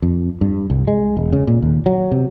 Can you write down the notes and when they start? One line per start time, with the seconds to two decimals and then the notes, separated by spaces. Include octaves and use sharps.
0.02 F2
0.41 G2
0.70 C2
0.87 G#3
1.17 E1
1.33 C#3
1.47 A#2
1.62 D#2
1.86 F#3
2.11 C3